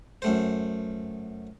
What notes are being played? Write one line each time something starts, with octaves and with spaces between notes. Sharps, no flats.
F#2 A3 C5